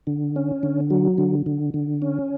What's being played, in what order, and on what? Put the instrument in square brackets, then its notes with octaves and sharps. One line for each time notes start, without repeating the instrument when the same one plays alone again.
[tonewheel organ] D3
C#4
D3
F#3
D3
D3
D3
C#4